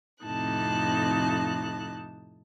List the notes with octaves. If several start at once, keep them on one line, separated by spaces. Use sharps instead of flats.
F2 A2 C3 D#4 A5 F#6